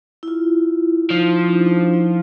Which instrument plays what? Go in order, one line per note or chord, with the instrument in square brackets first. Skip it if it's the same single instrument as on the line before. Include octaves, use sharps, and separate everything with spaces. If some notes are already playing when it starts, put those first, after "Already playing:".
[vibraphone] E4
F4
[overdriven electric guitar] F3 [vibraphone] D#4
[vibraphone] D#4
D4
D#4
D4
E4
E4